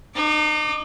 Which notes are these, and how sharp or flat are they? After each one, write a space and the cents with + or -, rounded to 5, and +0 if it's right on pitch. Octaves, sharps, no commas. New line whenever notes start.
D#4 -35 D6 +10